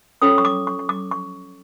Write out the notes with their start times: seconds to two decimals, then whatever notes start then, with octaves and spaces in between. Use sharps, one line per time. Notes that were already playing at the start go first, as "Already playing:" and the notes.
0.22 C#4 F4 A4 C#5 D#6
0.38 C#6
0.45 D6
0.67 C#6
0.79 C#6
0.89 D6
1.11 C#6